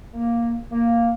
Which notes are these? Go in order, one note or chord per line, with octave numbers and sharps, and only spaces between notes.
A#3
A#3